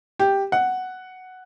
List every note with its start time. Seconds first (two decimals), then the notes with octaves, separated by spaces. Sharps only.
0.19 G4
0.52 F#5